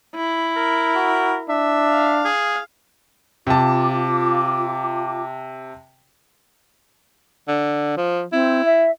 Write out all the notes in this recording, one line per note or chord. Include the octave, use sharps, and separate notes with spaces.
E4
A#4
F#4
D4 E5
F5
G#4
C3 F4 A5 D6
D3
F3
C4 E4
E5